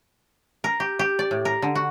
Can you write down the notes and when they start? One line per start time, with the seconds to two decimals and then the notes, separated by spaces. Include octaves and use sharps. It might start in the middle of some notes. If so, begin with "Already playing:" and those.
0.64 A#4
0.80 G4
0.99 G4
1.19 D5
1.31 A2
1.45 A#4
1.62 D3
1.75 F#4